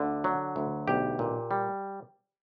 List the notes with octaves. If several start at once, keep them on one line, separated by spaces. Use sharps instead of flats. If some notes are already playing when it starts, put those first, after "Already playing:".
Already playing: D2 D3
F#3
D2
B1 G4
A#2
G3